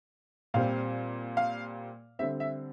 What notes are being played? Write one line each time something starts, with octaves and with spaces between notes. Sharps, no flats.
A#2 G3 C4 F5
F5
D3 G3 C4 E5
E5